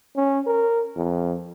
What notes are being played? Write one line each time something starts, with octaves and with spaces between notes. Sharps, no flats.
C#4
A#4
F2